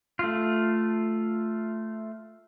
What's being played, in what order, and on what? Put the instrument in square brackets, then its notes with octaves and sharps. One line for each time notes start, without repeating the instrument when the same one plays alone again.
[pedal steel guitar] A3 F4